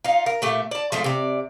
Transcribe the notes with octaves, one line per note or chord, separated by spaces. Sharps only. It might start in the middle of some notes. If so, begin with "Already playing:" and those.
D#4 F4
A#4
A#2 A3 G4
D5 A5
F3 G#3 A3
C3 D5